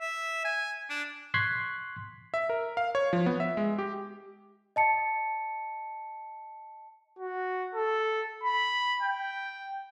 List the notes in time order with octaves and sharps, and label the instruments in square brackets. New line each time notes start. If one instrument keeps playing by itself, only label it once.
[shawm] E5
G#5
D4
[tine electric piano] C6 C#6 F#6 G#6 B6 C7
[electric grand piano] E5
A#4
F5
C#5
F3
B3
E5
G#3
G4
[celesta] D#5 A5 C#7
[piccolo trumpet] F#4
A4
B5
G5